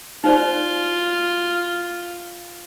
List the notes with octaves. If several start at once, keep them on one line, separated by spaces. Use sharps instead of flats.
D#4 F4 C5 D5